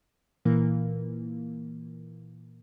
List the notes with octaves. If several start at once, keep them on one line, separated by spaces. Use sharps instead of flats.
A#2 E3 A#3